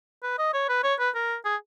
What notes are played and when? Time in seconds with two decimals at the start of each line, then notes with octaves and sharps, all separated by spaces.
0.23 B4
0.38 D#5
0.53 C#5
0.69 B4
0.83 C#5
0.99 B4
1.15 A#4
1.45 G#4